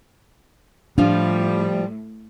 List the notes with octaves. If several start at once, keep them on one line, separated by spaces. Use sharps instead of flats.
A2 F3 G3 D4 F4